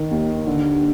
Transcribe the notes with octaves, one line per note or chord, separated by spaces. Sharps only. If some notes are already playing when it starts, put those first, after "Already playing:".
Already playing: D#3
D#2
D3